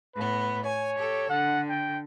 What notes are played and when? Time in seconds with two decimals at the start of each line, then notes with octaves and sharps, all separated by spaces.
0.15 A2 B3 B4
0.64 C#5 G#5
0.95 G4 A4
1.30 D3 F#5
1.69 G5